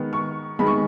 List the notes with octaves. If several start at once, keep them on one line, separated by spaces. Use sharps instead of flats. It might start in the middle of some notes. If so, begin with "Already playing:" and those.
Already playing: D#3 G#3 B3
C#6
D#3 G#3 B3 B5
C#6